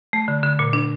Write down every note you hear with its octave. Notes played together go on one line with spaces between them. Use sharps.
A3
D3
D3
A#2
D4